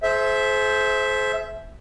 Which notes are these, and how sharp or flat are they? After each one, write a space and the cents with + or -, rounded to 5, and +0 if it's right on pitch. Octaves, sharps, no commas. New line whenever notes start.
G#4 +45 C5 +0 E5 +0